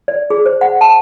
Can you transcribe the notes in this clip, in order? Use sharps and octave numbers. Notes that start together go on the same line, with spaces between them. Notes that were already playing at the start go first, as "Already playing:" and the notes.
D5
G#4
C5
F#5
A5